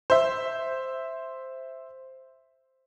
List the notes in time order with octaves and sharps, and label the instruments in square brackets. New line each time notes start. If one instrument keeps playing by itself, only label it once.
[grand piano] C5 E5